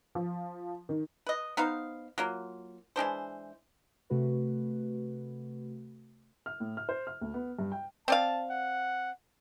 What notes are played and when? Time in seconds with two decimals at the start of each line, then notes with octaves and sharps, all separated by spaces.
0.15 F3
0.89 D#3
1.27 B4 D#5
1.57 B3 D#4 C5 F5
2.18 F#3 A#3 F4
2.96 E3 G#3 D4 C5
4.10 C3 A3 F#4 B4
6.46 F6
6.60 A2
6.77 F6
6.89 C5
7.07 F6
7.21 D2
7.34 B3
7.59 G2
7.72 G5
8.08 C4 D5 F5 A5
8.50 F#5